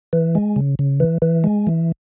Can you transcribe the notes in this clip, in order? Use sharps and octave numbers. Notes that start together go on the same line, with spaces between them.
E3
G#3
C#3
C#3
E3
E3
G#3
E3